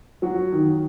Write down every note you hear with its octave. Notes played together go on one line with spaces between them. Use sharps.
F#3 F#4
D#3